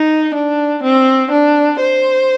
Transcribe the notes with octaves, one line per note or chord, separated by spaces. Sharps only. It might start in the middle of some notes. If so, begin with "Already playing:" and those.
Already playing: D#4
D4
C4
D4
C5